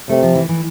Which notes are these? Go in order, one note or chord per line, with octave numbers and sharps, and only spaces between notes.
C3 A3
F3
E3
E3